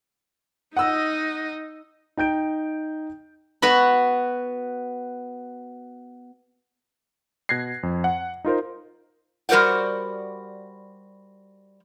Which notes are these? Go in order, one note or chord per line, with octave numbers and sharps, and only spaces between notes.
D#4 D#5 F#5 E6
D#4 G5 G6 D7
B3 F#4 B4 B5
B2 F#6 G#6 A#6 C7
F2
F#5
D#4 F4 A#4 C5
G3 F#4 A#4 C5 D5 F#5